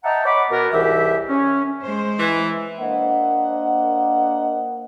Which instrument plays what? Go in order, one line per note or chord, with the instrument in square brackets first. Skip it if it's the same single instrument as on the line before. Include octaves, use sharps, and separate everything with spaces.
[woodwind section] D#5 E5 F#5 G5 A5 A#5
C#5 D#5 F#5 B5 D6
B2 B3 A#4
C2 G#2 E3 G4 E5
C#4
[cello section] G#3 C5
[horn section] E3
[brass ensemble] A#3 D4 C5 D#5 F#5